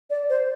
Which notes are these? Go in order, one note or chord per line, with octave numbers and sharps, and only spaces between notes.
D5
C5